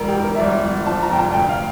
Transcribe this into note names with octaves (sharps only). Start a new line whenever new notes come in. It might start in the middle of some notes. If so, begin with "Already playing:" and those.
Already playing: E1 A#4
G4
E1
A#4
E5
G1 D5
G1
F3 A5
A#5
F1 G5
A5
D2 G5
F5